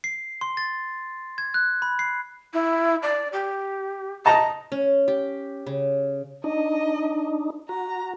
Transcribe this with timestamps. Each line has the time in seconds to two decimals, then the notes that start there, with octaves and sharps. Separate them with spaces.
0.04 C7
0.41 C6
0.57 A6
1.38 G#6
1.54 F#6
1.82 B5
1.99 C7
2.54 E4
3.03 D5
3.33 G4
4.26 D#5 A5 A#5
4.72 C#4
5.08 G4
5.66 C#3
6.44 D4 D#4 D#5
7.69 F#4 A#5